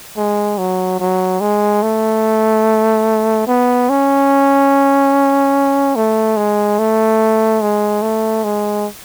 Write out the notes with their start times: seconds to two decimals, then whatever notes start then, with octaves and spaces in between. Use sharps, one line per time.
0.17 G#3
0.58 F#3
0.99 F#3
1.40 G#3
1.82 A3
3.47 B3
3.89 C#4
5.95 A3
6.37 G#3
6.79 A3
7.61 G#3
8.02 A3
8.44 G#3